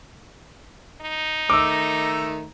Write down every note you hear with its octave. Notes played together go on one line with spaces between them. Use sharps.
D#4
D#3 A3 A#5 D6 E6